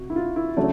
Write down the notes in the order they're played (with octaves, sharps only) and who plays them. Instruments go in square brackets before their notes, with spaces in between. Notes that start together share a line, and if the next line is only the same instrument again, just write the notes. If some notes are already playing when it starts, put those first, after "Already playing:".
Already playing: [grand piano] C3 [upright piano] F#4
[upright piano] E4
F4
E4
[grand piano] C#3 F#3 A3 [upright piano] D4